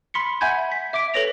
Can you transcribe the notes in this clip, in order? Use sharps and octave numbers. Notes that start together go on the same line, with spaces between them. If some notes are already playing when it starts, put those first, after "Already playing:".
B5 C6 B6 C#7
E5 F#5 G#5 B5 G6 G#6
B6
E5 D6 B6 D7
A4 B4 C#5 A#6 F7